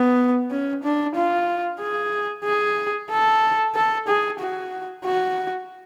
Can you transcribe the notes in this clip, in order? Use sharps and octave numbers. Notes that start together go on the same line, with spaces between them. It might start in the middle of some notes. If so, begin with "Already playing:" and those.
Already playing: B3
C#4
D4
F4
G#4
G#4
A4
A4
G#4
F#4
F#4